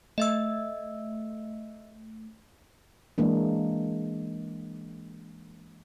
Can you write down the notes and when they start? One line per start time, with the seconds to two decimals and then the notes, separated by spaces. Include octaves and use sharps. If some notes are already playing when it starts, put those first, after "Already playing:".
0.18 A3 D#5 E5 E6
3.18 E3 G#3 A#3 D4